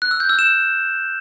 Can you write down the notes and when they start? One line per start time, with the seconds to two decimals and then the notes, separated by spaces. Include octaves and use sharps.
0.02 F#6
0.11 E6
0.20 G6
0.29 E6
0.39 E7